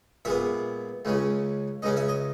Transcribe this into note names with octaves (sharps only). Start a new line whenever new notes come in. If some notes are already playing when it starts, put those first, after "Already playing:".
A#2 G#3 B3 E5
C#2 C#3 G#3 C#4
C#2 C#3 G#3 C#4 D#5
E5
D#5